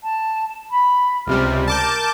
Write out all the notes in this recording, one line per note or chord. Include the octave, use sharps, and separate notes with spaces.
A5
B5
C#2 C3 G3 F6
A#4 A5 D6 G6